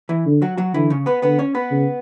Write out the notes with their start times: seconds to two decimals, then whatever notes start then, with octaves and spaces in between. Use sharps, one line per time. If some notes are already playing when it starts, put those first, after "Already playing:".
0.09 E3 E4
0.25 D3
0.42 F#3 F#4
0.57 F#3 F#4
0.74 D3 E3 E4
0.90 C#3 C#4
1.06 B3 B4
1.22 D3 B3 B4
1.39 C#4 C#5
1.55 B3 B4
1.71 C#3